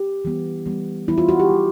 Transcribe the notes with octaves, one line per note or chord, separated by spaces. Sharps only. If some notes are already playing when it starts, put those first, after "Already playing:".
Already playing: G4
E3 G3 B3
E3 G3 B3
E3 G3 B3 E4
F4
F#4
G4
E3 G3 B3